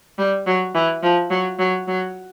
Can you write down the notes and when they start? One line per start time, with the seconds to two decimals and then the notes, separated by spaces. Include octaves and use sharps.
0.18 G3
0.47 F#3
0.75 E3
1.03 F3
1.30 F#3
1.59 F#3
1.88 F#3